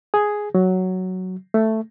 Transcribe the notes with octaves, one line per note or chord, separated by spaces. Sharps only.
G#4
F#3
A3